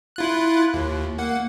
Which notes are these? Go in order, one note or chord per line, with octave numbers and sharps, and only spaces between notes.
E4 F4 F#6
D#2
A#3 F#5